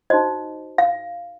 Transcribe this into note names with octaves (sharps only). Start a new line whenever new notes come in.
D#4 F#4 C5 D#5
F5